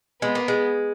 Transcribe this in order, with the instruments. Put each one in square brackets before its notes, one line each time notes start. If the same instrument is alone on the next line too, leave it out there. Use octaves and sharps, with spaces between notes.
[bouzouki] G#3 [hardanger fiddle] B3
[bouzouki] A#3
G#3